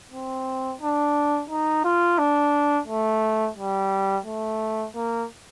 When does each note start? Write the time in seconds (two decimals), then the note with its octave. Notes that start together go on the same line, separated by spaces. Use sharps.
0.12 C4
0.81 D4
1.50 D#4
1.84 F4
2.18 D4
2.87 A3
3.56 G3
4.26 A3
4.95 A#3